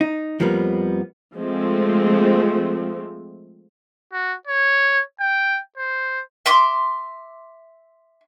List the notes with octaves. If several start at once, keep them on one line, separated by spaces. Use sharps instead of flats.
D#4
F2 F3 G3 A#3 B3
F3 G#3 A3 C4
F#4
C#5
G5
C5
E5 C6 D6